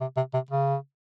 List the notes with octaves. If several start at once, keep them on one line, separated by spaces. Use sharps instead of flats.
C3
C3
C3
C#3